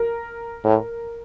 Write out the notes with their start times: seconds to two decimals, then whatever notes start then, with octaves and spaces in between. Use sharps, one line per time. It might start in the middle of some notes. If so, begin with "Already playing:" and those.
Already playing: A#4
0.64 A2